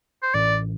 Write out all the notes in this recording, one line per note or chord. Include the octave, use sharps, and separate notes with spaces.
C5
A1 D5